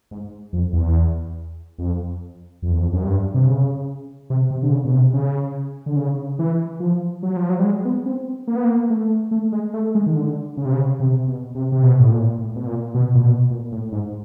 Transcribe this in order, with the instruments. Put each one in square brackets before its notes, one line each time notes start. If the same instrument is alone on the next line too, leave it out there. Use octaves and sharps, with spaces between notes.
[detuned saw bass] G#2
F2
E2
F2
F2
E2
F2
F#2
G2
C3
C#3
C3
C3
D3
C#3
B2
C3
C#3
D3
C#3
E3
F3
F#3
F3
F#3
G3
G#3
B3
C4
A#3
B3
A#3
A3
A3
G#3
A3
G#3
D#3
D3
C#3
C3
C#3
C3
B2
C3
C3
B2
A2
A#2
A2
B2
A#2
B2
A#2
B2
A#2
A2
G#2